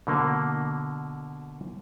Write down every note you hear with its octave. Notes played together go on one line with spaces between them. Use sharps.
B2 D3 A#3